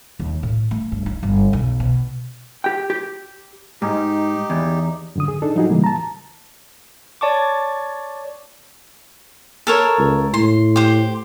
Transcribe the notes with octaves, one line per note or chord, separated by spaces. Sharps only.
D#2
A2
A3
G2
D#4
G1
B1
B2
G4 G5
G4
G#2 D#4 G4
E2
F#2 D3 D#6
G#4
D4 D#4 G#4 A4
F3 F#3 D#4 F#4 G#4
C#3 E3 G3 A#3
A5 A#5
C#5 D5 A5 C#6 D6
A4 A#4 C#5
C#2
A2 C6
G4 C5